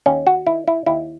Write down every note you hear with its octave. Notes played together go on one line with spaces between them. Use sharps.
D#2 C#4
F#4
D#3 E4
E4
D#2 E4